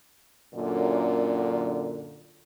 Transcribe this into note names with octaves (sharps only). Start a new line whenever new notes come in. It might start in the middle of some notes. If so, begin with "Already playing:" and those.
F#2 A#2 D3